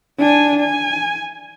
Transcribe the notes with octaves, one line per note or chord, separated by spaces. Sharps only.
D4 G#5
G#5